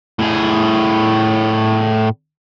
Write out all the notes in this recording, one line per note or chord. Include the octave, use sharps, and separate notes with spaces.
A2 G#4